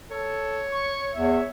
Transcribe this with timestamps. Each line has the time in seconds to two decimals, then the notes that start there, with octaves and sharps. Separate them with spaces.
0.11 A4 C#5
0.70 C#6
1.15 E2 E5